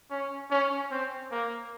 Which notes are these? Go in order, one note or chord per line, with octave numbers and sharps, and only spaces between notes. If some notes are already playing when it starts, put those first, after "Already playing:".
C#4
C#4
C4
A#3